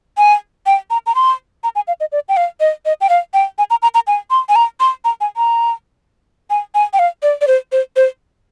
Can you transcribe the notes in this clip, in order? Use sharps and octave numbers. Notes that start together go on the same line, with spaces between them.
G#5
G5
A#5
A#5
C6
A#5
G#5
F5
D#5
D5
G5
F5
D#5
D#5
G5
F5
G5
G#5
A#5
A#5
A#5
G#5
C6
G#5
A#5
C6
A#5
G#5
A#5
G#5
G#5
G5
F5
D5
D5
C5
C5
C5